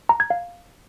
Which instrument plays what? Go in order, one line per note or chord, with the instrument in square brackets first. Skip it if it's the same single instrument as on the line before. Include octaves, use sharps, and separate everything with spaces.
[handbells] A#5
G#6
F5